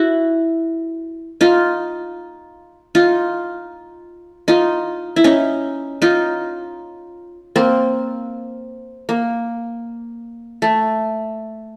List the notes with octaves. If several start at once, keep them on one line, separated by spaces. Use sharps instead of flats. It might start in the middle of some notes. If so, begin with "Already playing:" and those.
Already playing: E4 F#4
D#4 F4
D#4 F4
D#4 F4
E4
C#4 D#4
D#4 F4
A#3 C4
A#3
A3